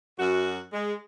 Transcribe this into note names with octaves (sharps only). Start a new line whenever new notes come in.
F#2 F#4
G#3